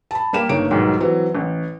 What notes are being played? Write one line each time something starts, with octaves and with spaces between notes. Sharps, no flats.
A5 B5
G3 A#3 G4 E7
G1 A#3 D#4 C#5 D7
B1 G#2 B2 D#3 F#3 G3
E3 F#3 C4
A1